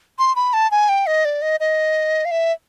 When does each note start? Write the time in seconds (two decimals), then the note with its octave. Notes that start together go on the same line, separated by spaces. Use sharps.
0.19 C6
0.36 B5
0.53 A5
0.71 G#5
0.89 G5
1.06 D#5
1.25 D5
1.42 D#5
1.60 D#5
2.25 F5
2.31 E5